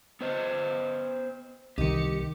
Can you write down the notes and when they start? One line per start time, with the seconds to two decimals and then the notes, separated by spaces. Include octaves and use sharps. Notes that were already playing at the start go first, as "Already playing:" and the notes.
0.21 B3 C5 D#5
1.78 C2 D#3 D#4 G4 C#7